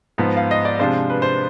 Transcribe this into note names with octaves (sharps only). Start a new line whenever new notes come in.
G#2 F3 B3
F5
D#5
D5
C3 F3 G#3 D4 F4 C5
B4
C5